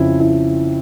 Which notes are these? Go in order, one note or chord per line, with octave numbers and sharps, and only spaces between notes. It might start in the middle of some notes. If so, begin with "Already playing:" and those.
Already playing: F2 C#3 F3 E4
E4